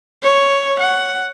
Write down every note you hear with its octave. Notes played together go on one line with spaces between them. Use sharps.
C#5
F#5